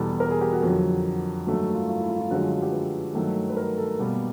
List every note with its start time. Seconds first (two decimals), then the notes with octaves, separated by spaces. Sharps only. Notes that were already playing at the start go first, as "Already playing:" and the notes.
Already playing: E2 B2 G3 A4
0.20 A#4
0.31 G#4
0.41 G4
0.53 F#4
0.63 F2 D3 F#3
1.46 G2 D#3 F#3 A3 F#4
1.75 F4
1.89 F4
1.99 E4
2.09 F4
2.20 F4
2.31 F#2 D3 F3 G#3 F#4
2.42 F4
2.52 F#4
2.62 G4
2.72 B4
3.14 G2 D#3 F#3 A3
3.49 B4
3.57 A#4
3.78 A4
3.99 B2 G3 A#3